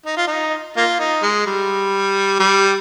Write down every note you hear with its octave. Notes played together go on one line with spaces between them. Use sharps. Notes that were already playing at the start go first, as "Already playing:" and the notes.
D#4
F4
D#4
A#3 F4
D#4
G#3
G3
G3